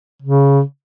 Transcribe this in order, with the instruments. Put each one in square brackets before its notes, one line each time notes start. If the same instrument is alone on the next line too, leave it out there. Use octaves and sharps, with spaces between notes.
[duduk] C#3